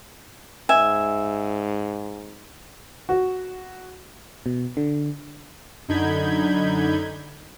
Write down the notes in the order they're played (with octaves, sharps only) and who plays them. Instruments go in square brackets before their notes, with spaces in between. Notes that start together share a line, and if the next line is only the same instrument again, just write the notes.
[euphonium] G#2 [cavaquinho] E5 G#5
[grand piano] F#4
[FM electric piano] B2
D3
[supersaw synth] F#2 D3 D#4 B5 G6 G#6